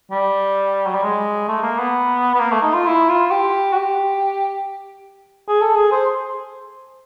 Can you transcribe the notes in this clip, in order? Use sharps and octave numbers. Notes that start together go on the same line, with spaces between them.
G3
F#3
G3
G#3
A3
A#3
B3
B3
A#3
A3
D#4
F4
E4
F4
G4
F#4
G4
G#4
A4
G#4
C5